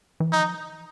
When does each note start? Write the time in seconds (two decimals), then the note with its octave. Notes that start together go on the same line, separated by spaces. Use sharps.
0.20 E3
0.32 F3 D#4